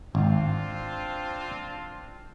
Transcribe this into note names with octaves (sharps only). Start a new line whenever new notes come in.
G#1 C4 D4 F4